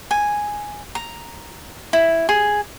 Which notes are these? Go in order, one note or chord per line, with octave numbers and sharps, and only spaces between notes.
G#5
A#5
E4
G#4